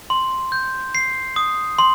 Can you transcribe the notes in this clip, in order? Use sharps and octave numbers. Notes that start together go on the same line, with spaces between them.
C6
G6
C7
D#6
C6